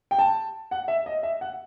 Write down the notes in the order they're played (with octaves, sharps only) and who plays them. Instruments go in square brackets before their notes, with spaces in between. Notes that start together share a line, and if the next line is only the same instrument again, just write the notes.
[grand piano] G5
A5
F#5
E5
D#5
E5
F#5